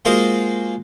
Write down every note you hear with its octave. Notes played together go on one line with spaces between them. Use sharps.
G#3 A#3 F4 F#4 G#4 C5